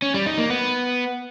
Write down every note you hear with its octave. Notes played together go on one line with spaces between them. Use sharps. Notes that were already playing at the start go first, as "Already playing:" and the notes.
C#4
G3
D#4
A#3
B3